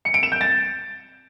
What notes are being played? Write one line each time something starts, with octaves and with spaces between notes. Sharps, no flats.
C#7
D7
E7
G6
A6